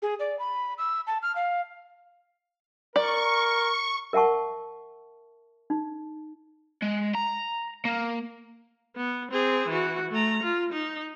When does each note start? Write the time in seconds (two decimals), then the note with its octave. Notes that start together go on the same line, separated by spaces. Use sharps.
0.02 G#4
0.20 D5
0.39 B5
0.78 E6
1.07 A5
1.22 F6
1.35 F5
2.96 A#4 D5 C#6
4.13 A#4 E5 F#5 A5 C#6
5.70 D#4
6.82 G#3
7.15 A#5
7.85 A#3
8.96 B3
9.31 C4 G#4
9.69 E3 F#4
10.11 A3 A#5
10.43 F4
10.73 D#4